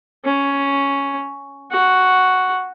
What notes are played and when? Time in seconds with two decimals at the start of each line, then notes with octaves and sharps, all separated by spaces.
0.25 C#4
1.71 F#4